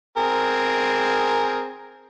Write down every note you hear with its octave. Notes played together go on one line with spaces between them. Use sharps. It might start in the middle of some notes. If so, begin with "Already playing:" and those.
C4 G#4 A#4